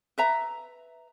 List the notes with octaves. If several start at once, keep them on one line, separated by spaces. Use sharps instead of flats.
B4 E5 A#5